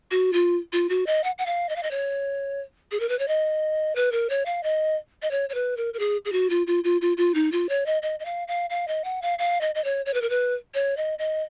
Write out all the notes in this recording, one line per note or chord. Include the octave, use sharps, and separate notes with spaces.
F#4
F4
F4
F#4
D#5
F#5
F#5
F5
D#5
F5
D#5
C#5
G#4
A#4
B4
C#5
D#5
B4
A#4
C#5
F5
D#5
D#5
C#5
C#5
B4
A#4
A#4
G#4
G#4
F#4
F4
F4
F4
F4
F4
D#4
F4
C#5
D#5
D#5
D#5
F5
F5
F5
D#5
F#5
F5
F5
D#5
D#5
C#5
C#5
B4
A#4
B4
C#5
D#5
D#5